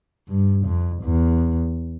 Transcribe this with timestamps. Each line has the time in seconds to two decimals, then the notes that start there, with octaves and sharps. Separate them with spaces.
0.29 G2
0.65 F2
1.03 E2